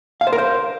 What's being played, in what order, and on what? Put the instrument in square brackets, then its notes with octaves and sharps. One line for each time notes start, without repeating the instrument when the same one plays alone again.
[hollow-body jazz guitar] F5
C5
A#4
C5